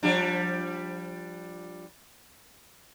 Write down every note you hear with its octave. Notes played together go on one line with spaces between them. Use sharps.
F3 G3 D4